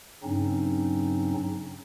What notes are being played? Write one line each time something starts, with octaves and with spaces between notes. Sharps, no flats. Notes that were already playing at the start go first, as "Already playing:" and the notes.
G2 C#3 F#3 C4 C#4 D#4